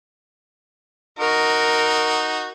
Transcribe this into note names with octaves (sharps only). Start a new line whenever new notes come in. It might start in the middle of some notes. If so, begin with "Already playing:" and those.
D#4 F#4 A#4